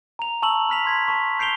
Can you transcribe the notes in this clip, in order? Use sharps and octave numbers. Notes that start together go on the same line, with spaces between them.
A#5 F7
A5 C#6 E6 F#7
B5 F6 B6 F7
C6 G#6 B6
A5 C#6
G6 C7 D7 F7 G7